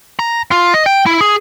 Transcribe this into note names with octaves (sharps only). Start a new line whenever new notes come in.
A#5
F4
D#5
G5
E4
G#4